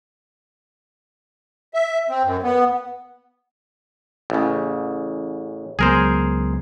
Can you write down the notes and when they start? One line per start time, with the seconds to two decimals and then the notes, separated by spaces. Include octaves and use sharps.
1.74 E5
2.09 C4
2.24 F#2
2.43 B3
4.30 A1 C#3
5.79 C#2 F#3 B3 G#4 A#4 C5